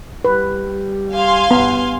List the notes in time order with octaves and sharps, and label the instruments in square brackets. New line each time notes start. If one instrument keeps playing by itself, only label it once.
[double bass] G3 [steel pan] B4
[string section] F5 G#5 C6
[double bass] G2 [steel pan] B3